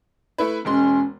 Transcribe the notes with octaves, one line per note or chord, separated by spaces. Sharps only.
A3 E4 B4
E1 G#3 C#4 C6